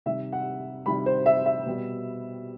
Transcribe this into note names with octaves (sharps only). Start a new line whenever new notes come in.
C3 D#3 G3 E5
F#5
C3 D#3 G3 B5
C5
E5
E5
B2 G3